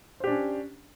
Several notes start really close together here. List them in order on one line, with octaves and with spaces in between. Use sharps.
C5 G4 D4 C#4